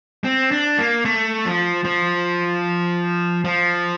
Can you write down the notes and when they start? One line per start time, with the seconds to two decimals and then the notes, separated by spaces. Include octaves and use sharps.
0.24 C4
0.51 D4
0.78 A#3
1.05 A3
1.46 F3
1.84 F3
3.44 F3